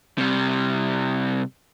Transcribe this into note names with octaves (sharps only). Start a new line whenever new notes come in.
C3 G3